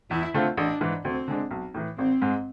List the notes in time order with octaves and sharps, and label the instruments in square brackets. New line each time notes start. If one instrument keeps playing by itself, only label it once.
[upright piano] E2 [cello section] E4
[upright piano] D3 A3 C4 F4
[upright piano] A1 [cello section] D4
[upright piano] G#2 E3
[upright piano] D2 [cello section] C4
[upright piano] D3 G#3 D4
B1
A2 E3
[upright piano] G#1 [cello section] C4
[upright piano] G#2 G#3